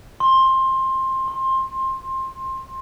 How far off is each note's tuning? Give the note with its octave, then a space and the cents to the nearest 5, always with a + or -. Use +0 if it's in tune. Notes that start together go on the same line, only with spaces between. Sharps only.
C6 +15
C6 +20